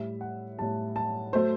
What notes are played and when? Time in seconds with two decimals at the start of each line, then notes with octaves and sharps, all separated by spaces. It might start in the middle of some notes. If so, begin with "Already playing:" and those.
Already playing: A2 G3 E5
0.21 F#5
0.58 A2 G3 A5
0.96 A5
1.33 F#3 A3 C5